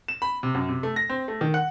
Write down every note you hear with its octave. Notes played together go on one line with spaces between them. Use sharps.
E7
B5
C3
F#2
C3
A3
A#6
C4
A3
D#3
F#5